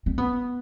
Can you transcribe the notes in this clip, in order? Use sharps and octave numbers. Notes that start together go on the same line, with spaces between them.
C4
B3